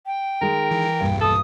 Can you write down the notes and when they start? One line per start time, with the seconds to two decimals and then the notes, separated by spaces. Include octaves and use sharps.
0.06 G5
0.41 D#3 G#3 A#4
0.71 E3
1.01 B1 E2 G2 A#2
1.21 A4 D#6